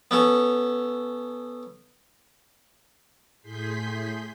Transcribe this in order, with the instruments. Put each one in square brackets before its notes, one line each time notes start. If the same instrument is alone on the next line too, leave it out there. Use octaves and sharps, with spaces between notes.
[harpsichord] B3 C#4 A4
[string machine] A2 G#4 C6 G6 B6